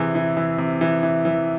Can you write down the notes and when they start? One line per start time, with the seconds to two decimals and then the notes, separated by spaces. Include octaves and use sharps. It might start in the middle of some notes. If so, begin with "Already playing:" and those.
Already playing: C3 E3 G#4
0.15 E3
0.37 E3
0.58 C3
0.81 E3
1.03 E3
1.25 E3